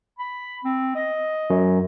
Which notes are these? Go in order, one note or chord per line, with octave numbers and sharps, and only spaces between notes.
B5
C4
D#5
F#2